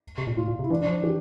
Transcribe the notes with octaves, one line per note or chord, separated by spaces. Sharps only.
C3
A#2
A2 F4
A#2
C3
E4
E3 D4
D4
F3
E3 G4